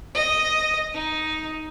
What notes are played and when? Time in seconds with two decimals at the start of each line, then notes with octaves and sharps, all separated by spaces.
0.15 D#5
0.94 D#4